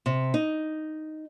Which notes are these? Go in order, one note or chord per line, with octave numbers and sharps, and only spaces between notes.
C3
D#4